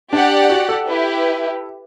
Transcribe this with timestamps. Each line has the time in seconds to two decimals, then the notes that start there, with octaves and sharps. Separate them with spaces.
0.13 D4 G4 D5 F#5
0.50 F#4
0.69 A4
0.86 E4 G4 B4